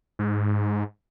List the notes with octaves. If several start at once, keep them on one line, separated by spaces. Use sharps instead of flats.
G#2